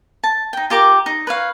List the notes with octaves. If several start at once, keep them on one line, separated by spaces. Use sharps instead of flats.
A5
D#4 G5
F4 G4 A#4 D6
D#4
B4 C#5 F5